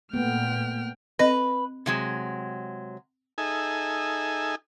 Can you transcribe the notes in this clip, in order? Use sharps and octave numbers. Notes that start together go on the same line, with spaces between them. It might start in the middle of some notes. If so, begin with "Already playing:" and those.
A#2 A3 B3 G5 F6
C4 B4 D#5 A#6
C3 F#3 G#3
D#4 G#4 A4 E5 G#5